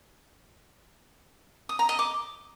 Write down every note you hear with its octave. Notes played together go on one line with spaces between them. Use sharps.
D#6
A#5
D#5
D6